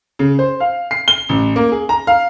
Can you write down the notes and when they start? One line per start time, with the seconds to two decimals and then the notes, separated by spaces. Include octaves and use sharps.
0.19 C#3
0.39 C5
0.60 F5
0.91 C7
1.08 G7
1.29 A1
1.56 A#3
1.72 G#4
1.89 A#5
2.07 F5